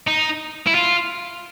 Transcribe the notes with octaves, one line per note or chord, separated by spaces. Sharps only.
D#4
E4
F4